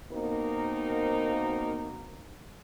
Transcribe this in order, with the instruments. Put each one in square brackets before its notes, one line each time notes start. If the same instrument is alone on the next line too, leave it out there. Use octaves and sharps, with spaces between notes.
[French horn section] B2 A#3 C4 D#4 A#4